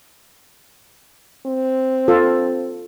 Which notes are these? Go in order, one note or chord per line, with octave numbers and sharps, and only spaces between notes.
C4
F4 A4